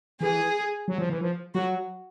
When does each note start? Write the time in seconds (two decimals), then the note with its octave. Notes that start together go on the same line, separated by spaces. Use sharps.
0.21 E3 G#4
0.88 F#3
0.98 F3
1.10 E3
1.21 F3
1.54 F#3 F#4